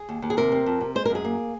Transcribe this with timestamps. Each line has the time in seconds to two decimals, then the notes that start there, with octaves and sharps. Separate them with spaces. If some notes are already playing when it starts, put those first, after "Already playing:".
Already playing: G#4
0.09 D#2
0.22 D#2
0.30 G#4
0.37 C3 A#4
0.52 C4
0.66 F2
0.81 C3
0.95 G#3 C5
1.05 A#4
1.10 F#2 G#4
1.25 A#3